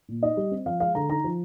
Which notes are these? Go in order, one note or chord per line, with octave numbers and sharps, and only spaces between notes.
A#2
D#4 D#5
G3
C4
F3 F5
G#3 F5
D3 A#5
D#4 A#5
F3